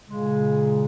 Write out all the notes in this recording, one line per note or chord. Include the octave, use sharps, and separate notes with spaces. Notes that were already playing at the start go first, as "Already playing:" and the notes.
A#2 C#3 G#3